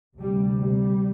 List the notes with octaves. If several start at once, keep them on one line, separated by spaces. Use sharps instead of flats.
D2 C3 G3
G3